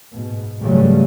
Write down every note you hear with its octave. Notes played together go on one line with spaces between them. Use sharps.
G#2 B2
G#2 C#3 E3 F#3 G3 A3